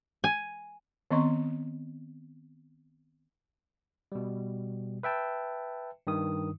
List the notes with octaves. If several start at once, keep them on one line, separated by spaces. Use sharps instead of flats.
G#5
D#3 B3 C4 D#5 C6 C#6
B2 G3
B4 E5 G5 A5
G2 D#3 D#6